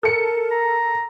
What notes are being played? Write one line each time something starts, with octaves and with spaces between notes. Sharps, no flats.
A4 A#4 C#7
A#5